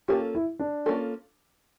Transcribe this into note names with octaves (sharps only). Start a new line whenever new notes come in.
A#3 C#4 F4 G4 A4
E4
D4
A#3 C#4 F4 A4